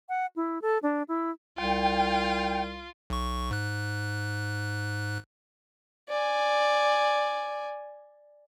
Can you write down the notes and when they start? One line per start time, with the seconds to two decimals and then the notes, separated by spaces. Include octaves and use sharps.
0.09 F#5
0.36 E4
0.62 A4
0.83 D4
1.08 E4
1.58 C2 F4 G5
3.10 B1 C#6
3.51 G#2 F#6
6.09 D5 G#5